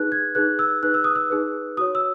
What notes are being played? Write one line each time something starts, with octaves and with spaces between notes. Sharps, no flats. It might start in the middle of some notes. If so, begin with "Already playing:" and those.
Already playing: D#4 G#4 B4 F#6
G#6
D#4 G#4 B4 F#6
E6
D#4 G#4 B4 F#6
E6
D#6
E6
D#4 G#4 B4
F#4 C#5 D#6
E6